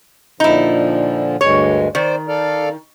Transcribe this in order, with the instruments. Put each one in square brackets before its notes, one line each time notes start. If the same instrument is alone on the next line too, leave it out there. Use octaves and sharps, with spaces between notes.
[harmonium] A#2 D3 F3 [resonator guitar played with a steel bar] D#4 E4
[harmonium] D2 G2 G#3 [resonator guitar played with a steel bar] C#5
[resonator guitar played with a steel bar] D#3 [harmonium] C5 D5
[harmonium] A4 D5 F5